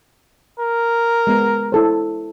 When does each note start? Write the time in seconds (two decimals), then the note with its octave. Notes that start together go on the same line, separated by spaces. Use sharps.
0.60 A#4
1.27 G#3 B3
1.72 E4 A4 C5